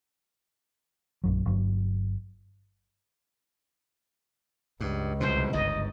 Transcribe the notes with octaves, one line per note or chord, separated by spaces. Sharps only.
A#1 F#2 F#3
G1 G2 F#3
C#2 G2
C2 F2 B2 C5
G1 G#2 D#5